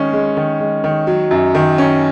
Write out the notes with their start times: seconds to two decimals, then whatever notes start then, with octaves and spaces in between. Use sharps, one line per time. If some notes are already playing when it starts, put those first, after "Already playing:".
Already playing: D#3 G#3 C#4
0.13 G#3
0.37 D#3
0.61 G#3
0.84 D#3
1.07 F#3
1.31 F#2
1.55 D#3
1.78 C#4